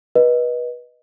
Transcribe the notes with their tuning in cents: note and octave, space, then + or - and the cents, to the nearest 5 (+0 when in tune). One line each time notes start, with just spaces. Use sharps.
B4 -25 D#5 +0